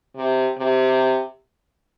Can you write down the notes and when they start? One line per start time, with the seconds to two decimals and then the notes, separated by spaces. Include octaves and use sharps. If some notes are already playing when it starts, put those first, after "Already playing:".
0.16 C3
0.58 C3